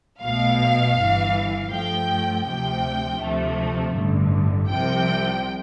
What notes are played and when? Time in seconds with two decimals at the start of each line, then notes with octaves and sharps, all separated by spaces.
0.20 B1 B2 A3 F5
0.95 G1 G2 E3
1.70 G2 F3 A3 G5
2.44 D2 C3 F3 G5
3.20 D2 C3 F3 A3
3.94 A1 G2 D3
4.69 C2 C3 F3 G5